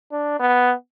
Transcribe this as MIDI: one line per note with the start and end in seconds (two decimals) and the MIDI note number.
0.12 0.39 62
0.40 0.73 59